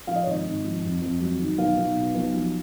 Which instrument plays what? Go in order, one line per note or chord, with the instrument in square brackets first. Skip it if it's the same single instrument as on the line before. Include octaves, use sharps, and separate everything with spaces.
[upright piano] F3 F5
D#5
C#5
G#1 D#5
G#1
F3
F2
F2
F#3
D#3
B1 F5
B1
B2
B1
F3